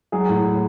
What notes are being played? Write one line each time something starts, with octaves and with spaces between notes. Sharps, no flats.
F#3 G#4
A2
A2